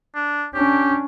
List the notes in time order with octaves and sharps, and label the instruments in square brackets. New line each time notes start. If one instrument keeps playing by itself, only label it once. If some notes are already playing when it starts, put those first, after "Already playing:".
[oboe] D4
[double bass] C#4 D4 [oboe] G4